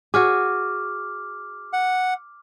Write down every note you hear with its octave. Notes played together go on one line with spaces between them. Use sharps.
F#4 G#4 D6 F6
F#5